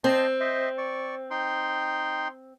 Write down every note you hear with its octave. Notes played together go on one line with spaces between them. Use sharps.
C4 C5 D#5 A5
C5 D#5 E5
D5 C#6
D#4 G5 C6